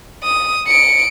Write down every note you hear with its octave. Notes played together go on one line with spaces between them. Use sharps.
D#6
C#7 D7